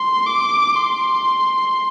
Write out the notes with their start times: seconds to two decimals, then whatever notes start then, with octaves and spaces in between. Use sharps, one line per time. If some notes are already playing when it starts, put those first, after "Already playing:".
Already playing: C6
0.26 D6
0.75 C6